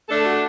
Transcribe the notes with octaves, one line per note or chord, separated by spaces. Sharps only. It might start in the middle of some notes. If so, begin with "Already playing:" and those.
A3 D4 A4
F#4